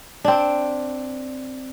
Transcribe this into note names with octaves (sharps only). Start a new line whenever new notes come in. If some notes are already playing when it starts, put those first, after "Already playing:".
C4 D4